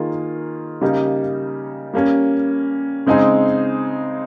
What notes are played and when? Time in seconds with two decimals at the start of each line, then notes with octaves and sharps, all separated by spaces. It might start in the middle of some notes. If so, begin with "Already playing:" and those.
Already playing: D#3 A#3 F4 G#4
0.81 C#3 G3 A#3 D#4 G4
1.94 G3 A#3 C#4
3.06 C#3 G#3 C4 D#4 G#4